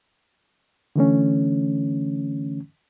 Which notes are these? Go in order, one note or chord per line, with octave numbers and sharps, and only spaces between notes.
D3 E3 A3 C#4